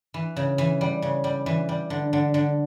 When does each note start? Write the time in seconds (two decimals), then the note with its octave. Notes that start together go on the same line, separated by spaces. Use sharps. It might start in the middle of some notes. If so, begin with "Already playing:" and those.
0.14 E3
0.36 C#3
0.58 E3
0.81 G3
1.02 C#3
1.24 G3
1.46 E3
1.69 G3
1.90 D3
2.13 D3
2.34 D3